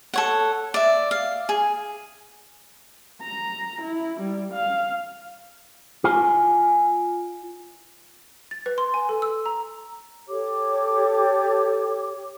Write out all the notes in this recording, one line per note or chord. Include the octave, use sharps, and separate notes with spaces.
A4 C#5 F#5
D5 E5
F5
G#4
A#5
E4
G3
F5
F4 F5 G#5
A6
B4
C6
G#5
A4
E6
A#5
G4 A4 C#5 D6